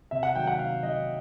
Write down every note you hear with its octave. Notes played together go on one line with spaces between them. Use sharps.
C3 E5
F#5
D#3 F#3 G5
F#5
C3 F5
D#3 F#3 D#5